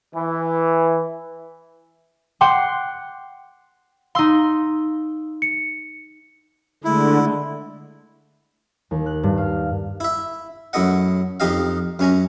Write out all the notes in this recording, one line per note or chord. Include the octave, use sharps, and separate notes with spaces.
E3
F#5 G5 C6 D6
D#4 F5 C6 E6
C#7
D3 G#3 A3 E4
D#2
F#6
G2
F5
E4 E5
F#2 A3 E4 D#5 F#5
F2 D#4 G4 D#5 F5
F#2 C#4 G#5 A#5